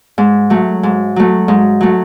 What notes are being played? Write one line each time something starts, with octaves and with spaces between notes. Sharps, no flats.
G#2
F#3 A3
G#2
F#3 A3
G#2
F#3 A3